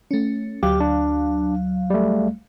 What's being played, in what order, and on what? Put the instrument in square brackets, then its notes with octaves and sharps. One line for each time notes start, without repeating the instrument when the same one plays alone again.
[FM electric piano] A3 C#4
[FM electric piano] D2 F#3 F5 [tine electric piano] G4
[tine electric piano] D4
G3 A3